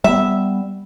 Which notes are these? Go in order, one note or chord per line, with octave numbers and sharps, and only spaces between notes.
G3 B3 E5